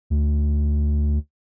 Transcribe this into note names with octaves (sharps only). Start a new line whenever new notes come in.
D2